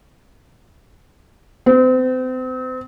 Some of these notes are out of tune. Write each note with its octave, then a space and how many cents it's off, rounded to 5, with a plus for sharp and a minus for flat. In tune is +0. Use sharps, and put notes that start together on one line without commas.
C4 -35